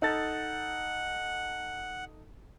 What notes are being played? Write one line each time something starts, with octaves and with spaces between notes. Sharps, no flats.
D#4 A4 F#5 A6